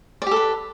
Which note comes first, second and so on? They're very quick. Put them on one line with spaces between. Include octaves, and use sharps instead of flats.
D5 G4 A4 B4